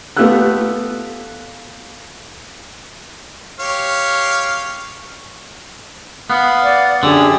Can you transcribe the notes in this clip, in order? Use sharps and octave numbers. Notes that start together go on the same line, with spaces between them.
A3 B3 F4 G4 E6 F#6
G4 C#5 F5
B3 F5 F#5
D5
F#2 D3 G4 G#4 E6